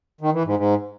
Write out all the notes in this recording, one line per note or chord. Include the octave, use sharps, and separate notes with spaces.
D#3
E3
G#2
G#2